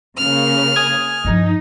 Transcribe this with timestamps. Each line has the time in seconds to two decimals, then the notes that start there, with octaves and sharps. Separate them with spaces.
0.18 C#3 A#3 F6
0.76 G#5 D#6 G#6
1.25 G2 F3 D#4